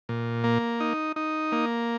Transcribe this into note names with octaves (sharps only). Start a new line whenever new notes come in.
A#2
A#3
D#4
D#4
A#3